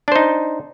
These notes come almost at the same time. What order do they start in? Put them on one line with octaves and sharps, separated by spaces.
D4 C5 D#4